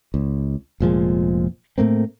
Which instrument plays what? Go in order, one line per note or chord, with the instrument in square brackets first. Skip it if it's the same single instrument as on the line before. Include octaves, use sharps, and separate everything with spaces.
[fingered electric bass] C#2
F1 A#2 F3 G#3
A2 A3 A#3 C4